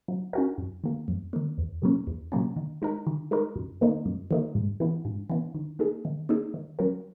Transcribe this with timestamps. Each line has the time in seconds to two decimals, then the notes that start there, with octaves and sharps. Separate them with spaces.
0.08 F#3
0.33 C#4 F#4 A#4
0.58 F#2
0.84 D#3 A#3
1.08 F#2
1.33 D#3 A#3
1.58 E2
1.82 B2 F#3 A#3 C#4
2.07 E2
2.32 B2 F#3 A#3 C#4
2.56 D#3
2.82 G#3 D#4 A#4
3.07 D#3
3.31 G#3 D#4 A#4
3.56 F#2
3.81 D#3 A#3 D#4
4.06 F#2
4.31 D#3 A#3 D#4
4.55 G#2
4.80 E3 B3
5.05 G#2
5.30 E3 B3
5.54 D#3
5.79 A#3 D#4 G#4
6.05 D#3
6.29 A#3 D#4 G#4
6.54 D#3
6.79 F#3 C#4 F#4 A#4